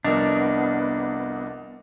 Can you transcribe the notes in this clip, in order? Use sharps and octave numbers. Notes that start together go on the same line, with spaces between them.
C2 F2 B3 D4 A#4 D#5